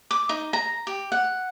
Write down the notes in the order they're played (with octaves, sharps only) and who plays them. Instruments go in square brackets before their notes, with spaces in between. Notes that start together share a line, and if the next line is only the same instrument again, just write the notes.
[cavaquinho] D6
D#4
A#5
G4
F#5